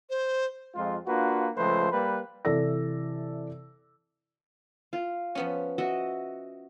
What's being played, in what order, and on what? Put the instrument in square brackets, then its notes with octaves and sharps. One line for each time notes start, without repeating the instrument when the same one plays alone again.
[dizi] C5
[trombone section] F2 G#3 F4
A#3 D4 F4 F#4 B4
C#2 F3 A3 B4 C5
G3 A#3 B4
[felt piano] C3 E3 A4 D5 E6 A#6
[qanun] F4
[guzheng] F3 B3 C#4
[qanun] F#4 D#5 E5